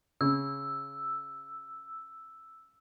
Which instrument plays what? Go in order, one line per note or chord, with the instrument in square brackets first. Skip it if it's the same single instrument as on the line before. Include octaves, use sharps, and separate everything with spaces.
[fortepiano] C#3 [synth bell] E6